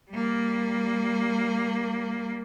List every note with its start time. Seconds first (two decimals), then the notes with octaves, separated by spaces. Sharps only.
0.11 G3 A#3